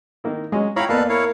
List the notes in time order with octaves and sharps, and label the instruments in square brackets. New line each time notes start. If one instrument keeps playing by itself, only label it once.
[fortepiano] D#3 A#3 E4
[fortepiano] F#3 C#4 D#5 [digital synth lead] G#3
[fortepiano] E4 F4 G5 [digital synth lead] C#5 [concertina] F5 A#5 B5
[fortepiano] E2 D#5 [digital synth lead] A#3 [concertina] A4 B4 F5 [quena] D5
[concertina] E4 C#5 F5 [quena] A#4